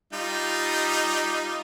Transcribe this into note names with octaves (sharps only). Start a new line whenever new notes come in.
G3 D#4 F4